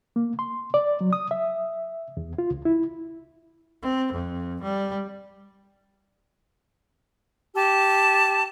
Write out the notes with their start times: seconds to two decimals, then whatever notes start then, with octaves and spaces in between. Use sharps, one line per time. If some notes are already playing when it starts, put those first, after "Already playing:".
0.16 A#3
0.39 C6
0.74 D5
1.01 F#3
1.13 D#6
1.31 E5
2.17 E2
2.38 F4
2.51 C#2
2.65 E4
3.83 C4
4.13 F2
4.63 G3
7.54 G4 A5